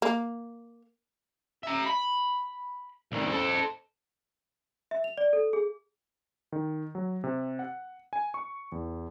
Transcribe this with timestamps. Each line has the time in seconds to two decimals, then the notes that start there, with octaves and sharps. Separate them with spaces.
0.02 A#3
1.63 E5 A#5
1.86 B5
3.12 C2 D#3
3.30 A4 C5
4.91 E5
5.04 F7
5.17 D5
5.33 A4
5.53 G#4
6.52 D#3
6.95 F#3
7.24 C3
7.59 F#5
8.13 G#5
8.34 C#6
8.72 E2